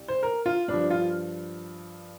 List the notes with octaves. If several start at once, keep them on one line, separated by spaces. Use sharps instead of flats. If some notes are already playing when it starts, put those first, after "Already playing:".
Already playing: C2
C5
A#4
F4
G2 F3 D4
F4